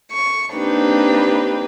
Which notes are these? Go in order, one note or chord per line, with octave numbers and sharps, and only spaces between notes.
C#6
A#3 C4 D4 D#4 G4 B4